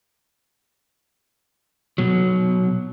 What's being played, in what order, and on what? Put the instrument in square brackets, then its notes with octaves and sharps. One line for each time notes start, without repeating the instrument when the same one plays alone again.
[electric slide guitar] B2 F#3